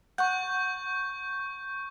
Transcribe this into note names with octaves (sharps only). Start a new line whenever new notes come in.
F#5 C#6 G6